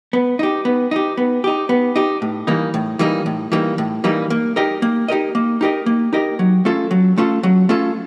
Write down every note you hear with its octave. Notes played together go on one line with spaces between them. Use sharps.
B3
D#4 G4
B3
D#4 G4
B3
D#4 G4
B3
D#4 G4
A2
E3 G3 A#3 D#4
A2
E3 G3 A#3 D#4
A2
E3 G3 A#3 D#4
A2
E3 G3 A#3 D#4
A#3
D#4 G4 A#4 D#5
A#3
D#4 G4 A#4 D#5
A#3
D#4 G4 A#4 D#5
A#3
D#4 G4 A#4 D#5
F#3
A3 C#4 F4 A4
F#3
A3 C#4 F4 A4
F#3
A3 C#4 F4 A4